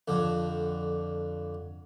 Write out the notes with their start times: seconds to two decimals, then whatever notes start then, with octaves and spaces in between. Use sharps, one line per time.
0.08 F2 D3